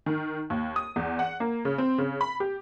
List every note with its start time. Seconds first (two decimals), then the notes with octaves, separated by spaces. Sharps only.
0.06 D#3
0.50 D#2
0.76 D#6
0.96 E2
1.19 F#5
1.40 A#3
1.65 C#3
1.78 C4
1.98 C#3
2.21 B5
2.40 G4